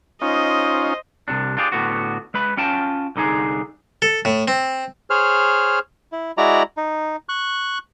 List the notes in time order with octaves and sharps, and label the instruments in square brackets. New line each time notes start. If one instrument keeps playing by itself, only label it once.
[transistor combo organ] C#4 D#4 F4 [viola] C5 D#5
[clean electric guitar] C2 G2 C3 D4
D4 F4 G4 G#4
A2 D3 B3 F#4
G#3 B4 B5
C#4 F4 G5 A5
C2 D3 D#4 G#4
[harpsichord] A4
A2
C4
[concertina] G#4 C5 C#5 F6
E4
G#3 E4 F#4 D5 A#5
D#4
C#6 F#6